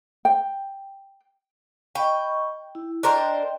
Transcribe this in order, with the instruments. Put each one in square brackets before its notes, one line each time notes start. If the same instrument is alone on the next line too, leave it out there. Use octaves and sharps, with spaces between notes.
[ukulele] G5
[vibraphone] D#5 B5 C#6 [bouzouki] G5
[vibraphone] E4
[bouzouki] D4 A#4 C5 [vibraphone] D#5 G5